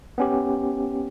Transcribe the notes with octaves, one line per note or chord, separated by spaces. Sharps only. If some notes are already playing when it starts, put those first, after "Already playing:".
B3 C#4 G4